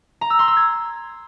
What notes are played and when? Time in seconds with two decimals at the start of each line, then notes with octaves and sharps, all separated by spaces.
0.21 A#5
0.30 E6
0.39 C6
0.48 E6
0.57 G#6